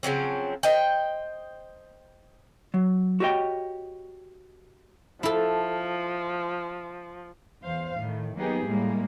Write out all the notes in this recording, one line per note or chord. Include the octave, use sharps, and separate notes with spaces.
C#3 F3 F#3 C4
C5 D#5 G5
F#3
F#4 G4 C#5 D#5 G5
F3 E4 A4
E2 C5 F5
A2 D#3
F#3 A#3 B3 D#4 G4 G#4
A2 G3 G#3 A#3